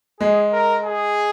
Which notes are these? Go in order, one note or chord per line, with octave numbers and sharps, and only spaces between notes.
G#3 G#4
A#4
G#4